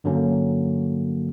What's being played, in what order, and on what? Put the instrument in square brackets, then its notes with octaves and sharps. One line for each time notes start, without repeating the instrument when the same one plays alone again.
[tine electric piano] G2 D3 F#3 A#3 C#4